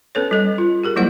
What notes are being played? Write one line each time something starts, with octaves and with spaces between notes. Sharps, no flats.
B3 C#4 A4 B4 C#5
G3 A4 D#5
F4
G4 G#4 A#4
F#3 G3 A#3 E4 C5 F#5